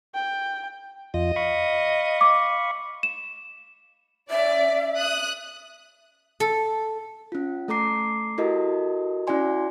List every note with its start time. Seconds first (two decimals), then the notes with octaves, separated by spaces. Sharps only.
0.15 G5
1.14 F2 F4 D#5
1.36 F5 B5 C#6
2.21 D6
3.03 E7
4.30 C#4 D5 E5
4.97 D#6 F#6
6.40 A4
7.32 C#4 F4
7.68 A3 A4 A#5 D6 C7
8.38 E4 F#4 G4 A4 A#4 D#5
9.27 C#4 E4 F#4 D5 G#5 C6